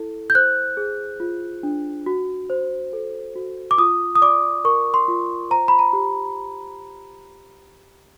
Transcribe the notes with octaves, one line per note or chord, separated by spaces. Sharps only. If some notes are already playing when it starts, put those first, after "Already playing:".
Already playing: E4 A4
G6
C5 F#6
G#4
F4
D4
F#4
C5
A4
F#4
D6
F4 D#6
D#6
D5 D6
A#4 C#6
C6
F4
C5 A#5
B5
A#5
G4